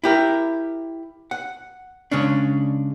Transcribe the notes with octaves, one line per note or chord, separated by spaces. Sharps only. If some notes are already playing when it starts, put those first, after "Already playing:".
E4 G4 A#4
F#5
C#3 G#3 C#4 D4